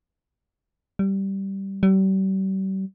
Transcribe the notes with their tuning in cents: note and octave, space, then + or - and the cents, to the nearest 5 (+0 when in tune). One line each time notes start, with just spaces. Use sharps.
G3 -10
G3 -40